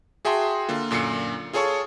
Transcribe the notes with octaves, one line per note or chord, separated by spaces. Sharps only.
F#4 G#4 E5 G5 A5 C6
D3 A#3 F4
F#2 A#2 D3 C7 C#7
F4 G#4 A4 C#5 A5 C#6